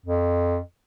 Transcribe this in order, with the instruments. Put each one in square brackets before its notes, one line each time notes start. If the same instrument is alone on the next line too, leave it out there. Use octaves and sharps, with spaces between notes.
[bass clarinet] F2